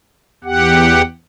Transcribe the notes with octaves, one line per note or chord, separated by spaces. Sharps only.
E2 G4 F#5